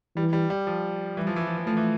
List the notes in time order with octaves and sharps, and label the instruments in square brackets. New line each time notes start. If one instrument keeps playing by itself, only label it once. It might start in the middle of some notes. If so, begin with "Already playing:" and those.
[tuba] E3 [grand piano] G3
[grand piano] G3
G3
F3
[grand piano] E3 [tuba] G3
[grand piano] F3
E3
F3
E3
[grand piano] F3 [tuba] A3
[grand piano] E3